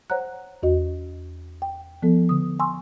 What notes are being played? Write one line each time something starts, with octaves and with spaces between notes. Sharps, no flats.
C5 C#5 F#5 A#5 F#6
E2 F#4 D#5
G5
F3 B3 A4
D3 D#6
G#5 C6 C#6 E6